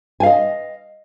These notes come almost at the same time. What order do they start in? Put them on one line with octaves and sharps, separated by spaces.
G#5 F5 D#5